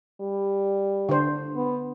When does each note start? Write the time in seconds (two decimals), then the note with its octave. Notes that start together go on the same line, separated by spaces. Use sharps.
0.21 G3
1.09 D3 C5
1.55 B3